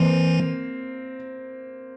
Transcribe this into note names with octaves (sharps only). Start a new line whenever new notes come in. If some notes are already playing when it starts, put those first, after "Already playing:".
Already playing: E3 A#3 C4